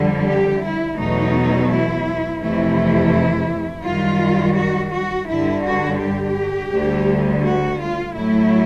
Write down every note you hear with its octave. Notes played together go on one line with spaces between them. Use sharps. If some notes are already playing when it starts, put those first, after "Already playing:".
Already playing: F2 D3 G3
G4
E4
E2 B2 F#3 A3 D#4
E4
F2 C3 E3 A3 E4
F#2 D#3 G3 F4
F#4
F#4
G2 D3 G3 E4
F#4
G4
D2 D3 G3
F#4
F4
A2 F#3 A3 E4